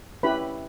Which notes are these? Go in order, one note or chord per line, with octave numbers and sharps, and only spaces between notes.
C#4 E4 G4 B4 B5